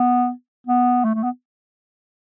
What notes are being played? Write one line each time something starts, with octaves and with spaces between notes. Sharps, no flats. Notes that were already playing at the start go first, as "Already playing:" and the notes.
Already playing: B3
B3
A3
A3
B3